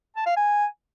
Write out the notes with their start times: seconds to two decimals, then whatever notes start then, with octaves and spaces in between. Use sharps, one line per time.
0.16 A5
0.26 F5
0.36 G#5